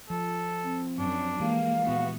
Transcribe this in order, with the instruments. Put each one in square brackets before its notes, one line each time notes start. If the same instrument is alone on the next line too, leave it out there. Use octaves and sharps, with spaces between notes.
[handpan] F3 [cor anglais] A4
[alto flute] C4
[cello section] F#2 [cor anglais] D4
[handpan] E3 G#3 G4 [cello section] A#3 [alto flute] F5
[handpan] A#2 E4 [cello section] B3 [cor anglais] F#4